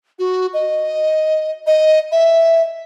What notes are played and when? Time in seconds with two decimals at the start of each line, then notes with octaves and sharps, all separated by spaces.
0.19 F#4
0.54 D#5
1.67 D#5
2.12 E5